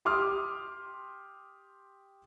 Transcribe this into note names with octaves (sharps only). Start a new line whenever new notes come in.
G4 C6 D6 D#6 F6